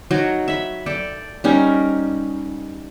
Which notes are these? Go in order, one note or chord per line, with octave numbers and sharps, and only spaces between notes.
F#3 D#4
E5 B5
A4 D5 G5
G3 C#4 D#4 A#4